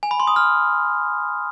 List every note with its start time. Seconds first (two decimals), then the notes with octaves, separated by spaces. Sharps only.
0.03 G#5
0.11 B5
0.20 C6
0.27 D#6
0.36 F6